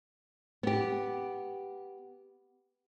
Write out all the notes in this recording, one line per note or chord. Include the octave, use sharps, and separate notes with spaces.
B3 G4